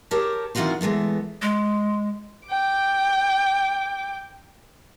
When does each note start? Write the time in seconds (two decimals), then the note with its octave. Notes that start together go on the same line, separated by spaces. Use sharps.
0.11 G4 A#4 C#5 A5
0.55 D#3 E3 C4 F4 F#4 C5
0.81 E3 G#3 A3 B3
1.42 G#3
2.47 G5 D6